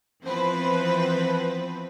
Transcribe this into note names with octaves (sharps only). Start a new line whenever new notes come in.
E3 F3 B3 C4 B4 C5